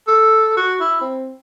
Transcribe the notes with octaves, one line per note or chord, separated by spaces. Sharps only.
A4
F#4
E4
C4